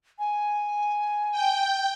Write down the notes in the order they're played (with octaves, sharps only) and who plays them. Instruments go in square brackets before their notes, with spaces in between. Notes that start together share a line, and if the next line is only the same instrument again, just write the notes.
[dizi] G#5
[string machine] G5